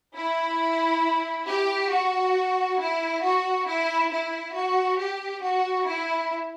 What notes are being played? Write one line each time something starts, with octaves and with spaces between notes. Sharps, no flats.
E4
G4
F#4
E4
F#4
E4
E4
F#4
G4
F#4
E4